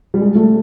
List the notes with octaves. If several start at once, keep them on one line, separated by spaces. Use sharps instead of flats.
G3
G#3
A3